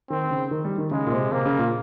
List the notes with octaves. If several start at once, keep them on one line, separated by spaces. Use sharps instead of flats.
D#3 C4
C#3
D#3
G3
D#3
C#3 G#3
A#2
C3
C3 A#3
C#3
A#2